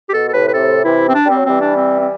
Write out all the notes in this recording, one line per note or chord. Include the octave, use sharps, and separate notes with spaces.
G4
B2 A4
A4
A2 C3 B4
B4
A2 C3 A4
C3 E3 E4
C4
D4
G3 C4
F#3
E3 G3 C4
D4
C4
C4